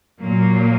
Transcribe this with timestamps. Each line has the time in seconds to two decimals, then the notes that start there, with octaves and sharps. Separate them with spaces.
0.21 A#2 F#3 A#3